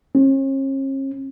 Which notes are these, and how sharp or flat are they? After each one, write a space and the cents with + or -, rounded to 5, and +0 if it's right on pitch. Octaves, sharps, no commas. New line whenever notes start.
C#4 -45